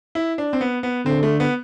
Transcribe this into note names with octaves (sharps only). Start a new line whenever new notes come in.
E4
D4
C4
B3
B3
D3 C4
A3
B3